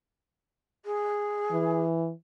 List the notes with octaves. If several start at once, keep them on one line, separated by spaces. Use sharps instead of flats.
G#4
E3